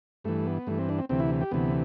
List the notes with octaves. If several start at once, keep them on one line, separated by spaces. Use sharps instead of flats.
G2 E3 A3
B3
G2 E3 A3
C4
D4
C4
D2 C3 E3 C4
E4
G4
D2 C3 E3 B3